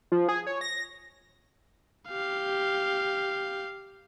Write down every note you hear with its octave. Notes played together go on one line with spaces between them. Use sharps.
F3
G#4
C#5
A#6
G4 F5